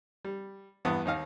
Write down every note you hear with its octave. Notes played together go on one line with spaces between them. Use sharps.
G3
E2 G2 B3 D#6
D#2 D#4 F5